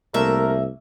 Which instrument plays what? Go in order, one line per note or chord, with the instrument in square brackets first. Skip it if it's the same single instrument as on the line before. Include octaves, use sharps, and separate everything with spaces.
[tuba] C2 [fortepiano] A3 A#3 [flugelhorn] A#4 [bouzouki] E5